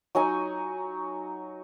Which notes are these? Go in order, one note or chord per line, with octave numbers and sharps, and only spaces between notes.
F#3 D#4 G#5